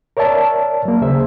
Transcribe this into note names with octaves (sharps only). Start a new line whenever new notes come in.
A#4 C#5 D5 E5 A5
F#3 A#3
D#2 C#3 G#4 C5 E5